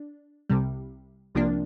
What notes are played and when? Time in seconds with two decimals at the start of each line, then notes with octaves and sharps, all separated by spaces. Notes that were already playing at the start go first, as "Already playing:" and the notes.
Already playing: D4
0.50 C2 C3 G3
1.35 C2 C3 F3 A#3 D4